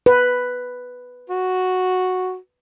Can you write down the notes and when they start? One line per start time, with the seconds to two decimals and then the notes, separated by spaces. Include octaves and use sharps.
0.06 B4
1.29 F#4